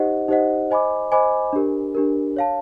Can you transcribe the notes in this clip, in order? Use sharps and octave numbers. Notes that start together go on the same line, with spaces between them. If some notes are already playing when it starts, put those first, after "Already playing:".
Already playing: D#4 G4 C5 D#5 F#5
D#4 G4 C5 D#5 F#5
C5 D#5 G#5 B5 D6
C5 D#5 G#5 B5 D6
D4 G4 A#4
D4 G4 A#4
C#5 F5 A5